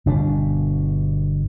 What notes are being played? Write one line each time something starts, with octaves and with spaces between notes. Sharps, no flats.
G1 B2 D4